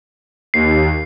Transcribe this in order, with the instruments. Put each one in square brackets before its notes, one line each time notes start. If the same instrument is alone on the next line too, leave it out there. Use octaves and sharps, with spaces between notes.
[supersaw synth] D#2 [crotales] C7